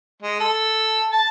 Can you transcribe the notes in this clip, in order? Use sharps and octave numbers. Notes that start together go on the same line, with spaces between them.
G#3
A4
A5